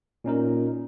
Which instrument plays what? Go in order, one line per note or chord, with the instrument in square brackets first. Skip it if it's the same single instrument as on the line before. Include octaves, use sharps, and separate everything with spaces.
[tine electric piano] A#2 C#4 D#4 A#4